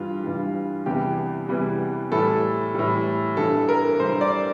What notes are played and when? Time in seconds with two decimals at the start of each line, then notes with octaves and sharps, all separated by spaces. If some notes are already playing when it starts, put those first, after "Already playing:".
Already playing: G2 E3 G3 F4
0.24 G2 E3 G3
0.86 E2 C3 E3 G3 G4
1.49 E2 C3 E3 G3
2.12 A2 E3 G3 A4
2.75 A2 E3 G3
3.37 G2 E3 G3 A4
3.69 A#4
4.00 G2 E3 G3 C5
4.21 D5